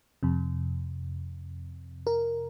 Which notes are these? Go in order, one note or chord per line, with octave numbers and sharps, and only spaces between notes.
F2 C3
A#4